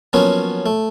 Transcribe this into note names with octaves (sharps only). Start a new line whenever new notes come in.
F3 F#3 A#3 B3 C#4
A3